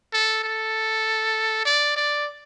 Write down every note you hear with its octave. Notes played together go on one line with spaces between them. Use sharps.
A4
A4
D5
D5